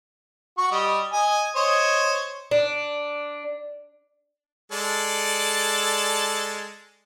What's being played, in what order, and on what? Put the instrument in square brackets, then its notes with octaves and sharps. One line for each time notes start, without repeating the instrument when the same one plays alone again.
[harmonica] F#4 C#6
G3 D#5
D#5 G#5
C5 C#5 D#5
[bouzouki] D4
[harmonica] G#3 A4 D5